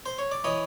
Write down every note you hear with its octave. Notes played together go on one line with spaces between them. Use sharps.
C5
C#5
D5
E3 C#5 D#5